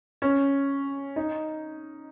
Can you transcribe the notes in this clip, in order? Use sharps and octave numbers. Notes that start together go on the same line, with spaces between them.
C#4
D#4